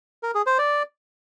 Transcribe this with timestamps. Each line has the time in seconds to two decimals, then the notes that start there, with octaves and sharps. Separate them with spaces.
0.23 A#4
0.35 G#4
0.47 C5
0.58 D5